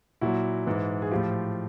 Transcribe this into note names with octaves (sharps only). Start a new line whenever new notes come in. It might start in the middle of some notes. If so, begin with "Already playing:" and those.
A#2 F#3 E4 F#4
G#2 E3
G#4
A2 F3 F4 G4